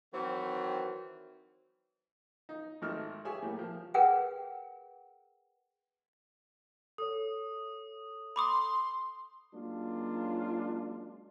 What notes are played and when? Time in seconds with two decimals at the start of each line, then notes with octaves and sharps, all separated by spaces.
0.14 D#3 E3 F#3 C4
2.49 D#4
2.82 G#1 A3 D#4 E5 F6
3.25 G4 G#4 C#5 E5 G#5
3.42 A2 G3 A#3
3.59 F3
3.94 G#4 A#4 B4 F#5 G5
6.98 A4 C#5 D#6
8.36 B5 C6 D6 D#6
9.53 F#3 G#3 A#3 C#4 D4 F4